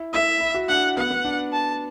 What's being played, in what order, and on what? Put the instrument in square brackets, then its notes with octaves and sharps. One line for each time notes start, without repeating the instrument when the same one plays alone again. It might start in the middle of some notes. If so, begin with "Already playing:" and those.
Already playing: [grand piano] E4
[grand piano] E4 [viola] E5
[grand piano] E4
F#4
[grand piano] D4 [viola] F#5
[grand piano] B3 [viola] F#5
[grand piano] B3
D4
[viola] A5